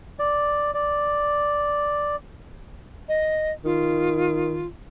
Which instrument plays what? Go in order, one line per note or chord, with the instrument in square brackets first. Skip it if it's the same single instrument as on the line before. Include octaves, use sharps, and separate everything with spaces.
[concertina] D5
D5
[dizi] D#5
[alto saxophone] D#3 [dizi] F4